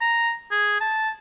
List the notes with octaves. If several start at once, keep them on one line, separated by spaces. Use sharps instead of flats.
A#5
G#4
A5